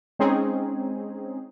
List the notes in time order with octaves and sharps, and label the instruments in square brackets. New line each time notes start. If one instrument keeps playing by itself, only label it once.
[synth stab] G#3 C4 C#4 D#4 G#4